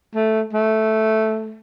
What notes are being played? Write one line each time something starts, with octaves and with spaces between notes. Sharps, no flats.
A3
A3